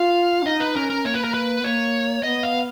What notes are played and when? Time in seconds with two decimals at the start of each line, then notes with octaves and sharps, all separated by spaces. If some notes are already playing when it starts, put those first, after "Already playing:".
Already playing: F4 F5
0.43 C#4
0.46 D#4 D#5
0.60 B4
0.76 C#4 A#4
0.90 A#4
1.05 A#3 C#5
1.14 B4
1.24 A#4
1.34 B4
1.60 B3
1.64 A#3 C#5
2.23 B3 D#5
2.43 F5